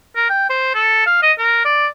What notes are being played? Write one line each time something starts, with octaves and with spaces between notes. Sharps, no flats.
A#4
G5
C5
A4
F5
D#5
A#4
D5